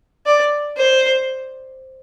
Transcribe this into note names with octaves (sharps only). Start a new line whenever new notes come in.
D5
C5